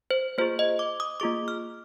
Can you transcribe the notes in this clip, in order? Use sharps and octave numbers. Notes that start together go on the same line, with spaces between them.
C5
A#3 F4 G#4 C5
D#5
D6
D#6
A#3 F4 G#4 D6
F6